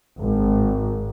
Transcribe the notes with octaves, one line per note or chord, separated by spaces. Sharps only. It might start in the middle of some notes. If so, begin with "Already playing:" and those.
G#1